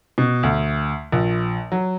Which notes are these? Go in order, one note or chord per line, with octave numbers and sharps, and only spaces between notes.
B2
D2
A#1
F#3